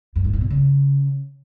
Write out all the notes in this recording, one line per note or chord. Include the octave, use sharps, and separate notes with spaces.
F#2
G#2
A2
B2
C#3